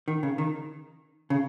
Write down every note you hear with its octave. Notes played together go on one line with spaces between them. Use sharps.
D#3
C#3
D#3
C#3